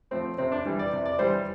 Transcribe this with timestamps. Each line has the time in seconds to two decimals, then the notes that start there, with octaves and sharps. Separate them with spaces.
0.11 F3 A3 C4
0.38 C3 C4
0.52 D4
0.65 E3 G3
0.79 D5
0.92 C3
1.06 D5
1.19 E3 G3 C5